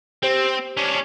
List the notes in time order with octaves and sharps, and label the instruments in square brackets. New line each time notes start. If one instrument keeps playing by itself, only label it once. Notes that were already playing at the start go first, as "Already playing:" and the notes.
[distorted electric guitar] C4 [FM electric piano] G4 C5
[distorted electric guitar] C#4 D4